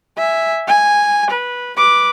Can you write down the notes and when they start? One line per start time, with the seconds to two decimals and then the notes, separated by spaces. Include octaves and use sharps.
0.17 E5 G#5
0.68 G#5
1.31 B4
1.77 B4 D6